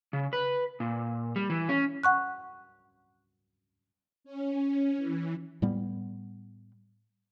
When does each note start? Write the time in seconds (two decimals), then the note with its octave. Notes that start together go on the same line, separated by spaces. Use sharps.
0.13 C#3
0.33 B4
0.80 A#2
1.36 G3
1.50 E3
1.69 C#4
2.03 F#5 C#6 F#6
4.24 C#4
4.98 E3
5.62 A2 G3 B3